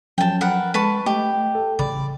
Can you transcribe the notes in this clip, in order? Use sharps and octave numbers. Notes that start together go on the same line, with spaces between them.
F3 F#3 C#4 G5 A5
A#4 B4 F#5
G#3 B4 A5 C#6
A3 G4 D#5
A4
A1 C#3 D5 B5